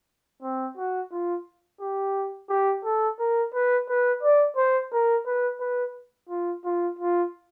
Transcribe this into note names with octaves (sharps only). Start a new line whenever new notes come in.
C4
F#4
F4
G4
G4
A4
A#4
B4
B4
D5
C5
A#4
B4
B4
F4
F4
F4